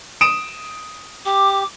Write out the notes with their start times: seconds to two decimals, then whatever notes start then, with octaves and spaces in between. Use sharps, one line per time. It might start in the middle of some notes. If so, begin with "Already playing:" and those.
0.21 D#6 D7 E7
1.26 G4 D6